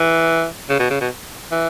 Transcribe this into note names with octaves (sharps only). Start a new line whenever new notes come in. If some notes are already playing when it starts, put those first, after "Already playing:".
Already playing: E3
C#3
B2
C#3
B2
E3